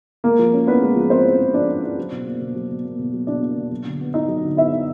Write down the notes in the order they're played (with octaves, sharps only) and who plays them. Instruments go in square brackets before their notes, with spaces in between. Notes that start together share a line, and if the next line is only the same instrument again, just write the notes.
[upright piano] G#3 A#3 A#4
F3
C#4
B3 E4 B4
G#3
F3
C4 C#4 C5
E4
G#3
F3 D4 D5
C#4
E4
F#3
B2
A#3
B2
F#3
B2
A#3
B2
F#3
B2 D4 D5
A#3
B2
F#3
D3
B3
D#4 E4 D#5
F#3
D3
B3 E4 E5
E4